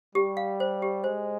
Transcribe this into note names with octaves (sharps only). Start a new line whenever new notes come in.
G3 G4
F5
C5
G4
G#3 C5